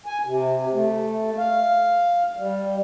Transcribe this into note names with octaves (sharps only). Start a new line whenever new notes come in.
G#5
C3
A3
F5
G3